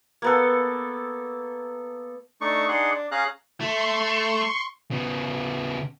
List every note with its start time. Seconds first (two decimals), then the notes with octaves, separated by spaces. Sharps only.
0.22 A#3 B3 A4
2.41 A3 D4 D#4 C#6
2.69 D4 D#4 G#4 F#5 C6
2.91 D4
3.11 C#4 G#4 F5 A#5 F#6
3.61 A3 C6 C#6
4.91 C#3 B3